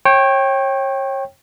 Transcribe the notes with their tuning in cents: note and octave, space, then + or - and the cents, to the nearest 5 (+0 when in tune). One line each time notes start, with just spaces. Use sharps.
C#5 -30 G5 +0